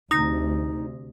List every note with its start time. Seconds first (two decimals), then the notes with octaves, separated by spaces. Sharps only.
0.11 D2 C3 D#4 D#6 A#6